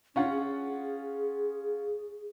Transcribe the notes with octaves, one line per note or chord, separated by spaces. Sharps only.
C#4 D4 F4 F#5
G#4